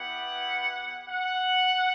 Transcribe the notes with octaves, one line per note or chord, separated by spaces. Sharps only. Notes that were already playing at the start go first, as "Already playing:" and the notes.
Already playing: B3 E4 G4 F#5
F#5